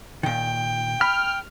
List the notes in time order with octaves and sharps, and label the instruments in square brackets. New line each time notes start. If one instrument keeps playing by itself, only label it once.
[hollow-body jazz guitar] A#2 D#3 [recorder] G5
[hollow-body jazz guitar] B5 [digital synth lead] F6